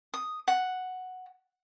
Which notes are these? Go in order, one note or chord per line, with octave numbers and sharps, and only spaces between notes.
D#6
F#5